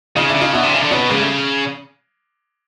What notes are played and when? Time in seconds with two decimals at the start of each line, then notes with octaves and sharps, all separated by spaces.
0.16 C#3 D#4 F4
0.29 D4 E4
0.35 C#3
0.41 D#4 F4
0.53 B2 D4 E4
0.63 C3
0.73 C#3
0.81 D3
0.91 B2 C#4 D#4
1.09 C#3 G#3 A#3
1.20 G3 A3